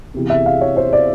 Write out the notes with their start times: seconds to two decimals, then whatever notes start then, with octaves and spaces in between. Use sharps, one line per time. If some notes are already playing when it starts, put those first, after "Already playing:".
0.14 E2 C3 E3
0.30 E5
0.46 F5
0.61 C#5
0.77 C5
0.93 D5